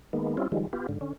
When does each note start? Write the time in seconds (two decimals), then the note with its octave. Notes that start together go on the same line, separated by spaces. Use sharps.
0.13 D#3 G#3 A#3 B3
0.37 G3 C4 C#4 E4 F4
0.52 D#3 F3 G3 G#3
0.73 B3 F4 G4
0.89 G#2 D3
1.01 D3 C#4